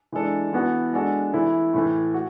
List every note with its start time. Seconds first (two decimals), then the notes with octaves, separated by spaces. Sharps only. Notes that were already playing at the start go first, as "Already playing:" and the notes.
0.12 E3 G#3 D4 A4
0.53 E3 B3 F#4 A4
0.93 G#3 D4 F#4 A4
1.33 E3 A3 E4
1.74 A2 E3 A3
2.14 F#4